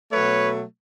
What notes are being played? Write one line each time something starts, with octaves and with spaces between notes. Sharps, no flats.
B2 F#3 A3 B4 C#5